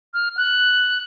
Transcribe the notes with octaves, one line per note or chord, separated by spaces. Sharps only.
F6
F#6